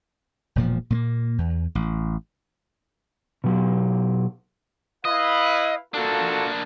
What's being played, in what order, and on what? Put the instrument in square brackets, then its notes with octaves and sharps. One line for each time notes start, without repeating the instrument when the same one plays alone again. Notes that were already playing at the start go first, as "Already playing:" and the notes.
[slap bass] E1 A#2 F3
A#2 A3 A#3
E2
A1
[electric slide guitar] B2 F#3 G4
[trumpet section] E4 B4 F5 [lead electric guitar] D#5
[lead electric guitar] A#3 D4 [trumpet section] F4 F#4 A4